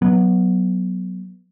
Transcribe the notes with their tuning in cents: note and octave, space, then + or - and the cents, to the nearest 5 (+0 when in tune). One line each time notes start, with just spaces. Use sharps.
F#3 +0 B3 -15